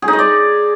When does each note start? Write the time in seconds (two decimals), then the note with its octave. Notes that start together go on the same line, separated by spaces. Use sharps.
0.02 G#4
0.08 D#4
0.13 D#5
0.19 D5